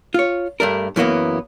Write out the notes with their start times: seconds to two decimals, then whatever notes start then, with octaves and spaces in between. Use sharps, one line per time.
0.14 F4 C#5
0.60 G2 A3 D4 A#4
0.96 F#2 E3 F#3 A#3 B3